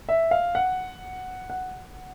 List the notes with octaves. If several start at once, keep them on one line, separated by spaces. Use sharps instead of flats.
E5
F5
F#5
F#5